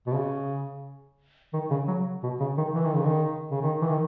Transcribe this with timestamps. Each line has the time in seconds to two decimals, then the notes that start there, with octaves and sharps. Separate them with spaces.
0.06 B2
0.14 C#3
1.53 D#3
1.70 C#3
1.88 F#3
2.23 B2
2.40 C#3
2.57 D#3
2.74 E3
2.85 D#3
2.95 C#3
3.05 D#3
3.50 C#3
3.62 D#3
3.81 E3
3.88 D#3